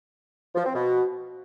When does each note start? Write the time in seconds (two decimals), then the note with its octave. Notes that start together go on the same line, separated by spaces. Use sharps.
0.55 F3
0.65 C4
0.75 B2